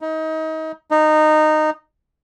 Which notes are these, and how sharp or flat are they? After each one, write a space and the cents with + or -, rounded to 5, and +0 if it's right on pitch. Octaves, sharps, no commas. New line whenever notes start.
D#4 +30
D#4 -15